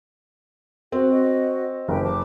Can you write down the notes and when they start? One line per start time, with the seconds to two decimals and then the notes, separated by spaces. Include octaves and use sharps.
0.92 C4 F#4
1.12 F#4 D#5
1.88 F#1 G4 B4 G5
2.04 A5 D6